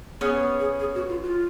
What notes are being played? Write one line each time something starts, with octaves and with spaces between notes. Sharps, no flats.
B3 C#4 G#4
G#4
G#4
F#4
F4
F4